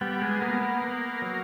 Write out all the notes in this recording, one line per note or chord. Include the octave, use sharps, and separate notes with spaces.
G3 B3
G#3
A#3 B3
A#3
B3
F#3